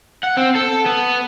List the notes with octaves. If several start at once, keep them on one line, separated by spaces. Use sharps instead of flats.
F#5
C4
A4
B3